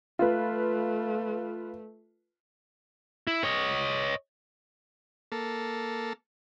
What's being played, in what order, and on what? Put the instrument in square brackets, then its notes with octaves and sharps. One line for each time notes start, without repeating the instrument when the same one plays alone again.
[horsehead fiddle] A3 [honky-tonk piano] F4 B4
[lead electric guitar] E4
C#5 D#5
[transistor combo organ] A#3 A4